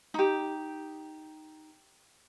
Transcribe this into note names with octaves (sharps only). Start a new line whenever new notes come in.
D#4 G4